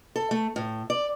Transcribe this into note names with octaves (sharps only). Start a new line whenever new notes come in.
A4
A3
A2
D5